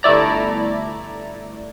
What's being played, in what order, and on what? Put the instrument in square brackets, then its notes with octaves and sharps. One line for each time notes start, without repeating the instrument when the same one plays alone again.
[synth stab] G1 A3 E4 D5 A#5